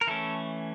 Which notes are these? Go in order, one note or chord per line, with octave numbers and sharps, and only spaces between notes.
A#4
E3 A3 C#4 A4